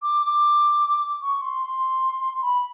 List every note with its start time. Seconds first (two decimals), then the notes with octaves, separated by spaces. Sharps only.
0.02 D6
0.22 D6
1.22 C#6
1.42 C6
1.61 C6
2.42 B5